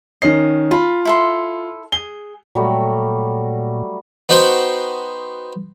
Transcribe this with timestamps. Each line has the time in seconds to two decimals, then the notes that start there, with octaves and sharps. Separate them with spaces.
0.22 D#3 C#4 D#5 C7
0.71 F4 A5 B5
1.05 E4 A4 C6
1.92 G#4 G7
2.55 A#2 F#3 G3 A3
4.29 B3 D#4 F#4 C5 G5